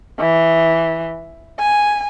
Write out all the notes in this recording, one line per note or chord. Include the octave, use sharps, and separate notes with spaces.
E3
G#5